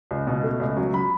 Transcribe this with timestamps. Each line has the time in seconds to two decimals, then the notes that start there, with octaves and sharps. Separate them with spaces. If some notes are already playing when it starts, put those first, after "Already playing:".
0.11 C#2
0.27 B2
0.43 A3
0.60 C#2
0.77 F#3
0.93 F#3 B5